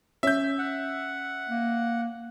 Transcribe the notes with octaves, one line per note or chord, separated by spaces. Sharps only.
C#4 E5 G6
F#5
A#3